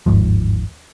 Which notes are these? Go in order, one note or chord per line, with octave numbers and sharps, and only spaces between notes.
G1 D#2 G#2 F3